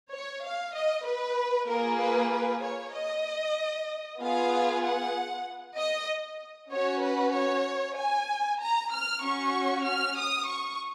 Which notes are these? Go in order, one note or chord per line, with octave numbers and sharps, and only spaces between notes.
C#5
F5
D#5
B4
A#3 F4 G#4 A#4
B4
B4
C#5
D#5
B3 F4 G#4 F5
F#5
D#5
C#4 F#4 C#5
B4
C#5
G#5
A#5
F6
C#4 F#4 C#6
F6
D#6
C#6